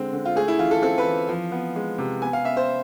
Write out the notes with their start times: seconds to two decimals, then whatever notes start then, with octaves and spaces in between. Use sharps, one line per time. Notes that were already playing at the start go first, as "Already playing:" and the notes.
Already playing: D3 G#3 C4
0.13 D3
0.25 F4
0.36 A3 G#4
0.48 E4
0.59 E3 F4
0.71 A4
0.82 C4 A4
0.98 B4
1.06 E3
1.29 F3
1.52 B3
1.76 G#3
1.98 C3
2.22 B3 G#5
2.33 F5
2.45 B3 E5
2.57 C5